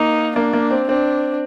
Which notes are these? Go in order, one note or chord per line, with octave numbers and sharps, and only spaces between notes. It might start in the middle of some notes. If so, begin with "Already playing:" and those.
Already playing: A#3 D#4
A#3 D4
A#3
C4
C4 D4